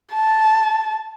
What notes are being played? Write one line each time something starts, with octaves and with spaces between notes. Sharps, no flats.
A5